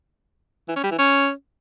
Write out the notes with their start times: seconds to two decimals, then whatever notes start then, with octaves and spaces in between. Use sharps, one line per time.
0.69 E3
0.76 C#4
0.84 G3
0.91 E3
0.99 C#4